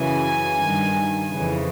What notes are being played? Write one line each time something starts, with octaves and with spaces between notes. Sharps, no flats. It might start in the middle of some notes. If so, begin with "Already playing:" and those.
Already playing: F#2 C#3 E3 G#5
G2 D#3
F2 C#3 E3